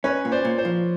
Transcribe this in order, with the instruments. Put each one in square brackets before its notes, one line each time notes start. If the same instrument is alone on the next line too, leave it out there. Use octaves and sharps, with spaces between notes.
[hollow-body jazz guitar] C#4 [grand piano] B4 C#5
[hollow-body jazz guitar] A#2
[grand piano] C5 D5
[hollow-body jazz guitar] A#2
[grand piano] C5
[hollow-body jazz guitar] F3